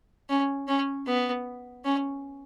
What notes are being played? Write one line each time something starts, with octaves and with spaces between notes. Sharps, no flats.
C#4
C#4
B3
C#4